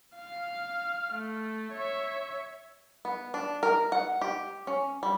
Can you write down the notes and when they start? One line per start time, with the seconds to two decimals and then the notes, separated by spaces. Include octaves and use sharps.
0.17 F5 F6
1.13 A3
1.73 C#5 E5
3.05 B3
3.34 D4
3.63 A#4
3.92 F#5
4.21 G4
4.67 C#4
5.03 G3